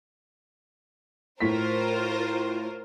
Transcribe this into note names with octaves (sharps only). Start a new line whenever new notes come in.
A2 F4 A#4 C5 B6